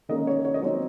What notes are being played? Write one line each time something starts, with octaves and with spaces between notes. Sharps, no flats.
D#3 A#3 C#4 D#5
C#5
C#5
D#5
F#3 C4 D#4 C#5